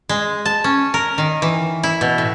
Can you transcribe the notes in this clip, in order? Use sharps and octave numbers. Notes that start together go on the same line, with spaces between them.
G#3
A5
C#4
A#4
D#3
E3
E4
B2
A2